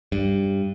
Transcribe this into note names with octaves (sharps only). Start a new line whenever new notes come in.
G2